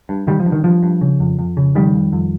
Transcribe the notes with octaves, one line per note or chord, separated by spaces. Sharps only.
G2
G2 D#3 G3
F3
G2
D#3
G2 F3
G2
C#3
F2
F2
C#3
F2 D#3 G3
F2
F2